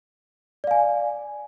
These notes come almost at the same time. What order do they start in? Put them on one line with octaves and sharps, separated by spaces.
D5 F5 G#5